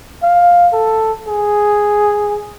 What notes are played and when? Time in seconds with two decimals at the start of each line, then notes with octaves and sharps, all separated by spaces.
0.23 F5
0.73 A4
1.28 G#4